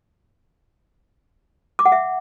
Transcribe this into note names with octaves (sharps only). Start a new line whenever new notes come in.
D6
F#5
E5